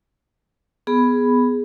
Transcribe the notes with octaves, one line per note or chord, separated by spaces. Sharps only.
B3 G#4 B5